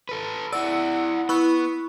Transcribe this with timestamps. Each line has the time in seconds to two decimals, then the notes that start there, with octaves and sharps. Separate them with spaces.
0.09 A4 B4
0.53 E4 D5 F#5 E6
1.29 B3 E4 B5 C#6 F#6